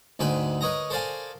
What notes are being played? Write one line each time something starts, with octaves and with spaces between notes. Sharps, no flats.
D2 G#2 B4 G5 G#5 B5
A#4 B4 C#5 D#5 A#5
A4 A#4 C5 D5 F5 G#5